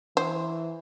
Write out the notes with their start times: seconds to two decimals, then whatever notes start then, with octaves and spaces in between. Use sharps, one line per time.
0.17 E3 C5